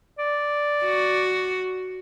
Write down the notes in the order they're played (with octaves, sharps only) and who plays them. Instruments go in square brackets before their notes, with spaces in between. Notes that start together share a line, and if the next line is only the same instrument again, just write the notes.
[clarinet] D5
[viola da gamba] F#4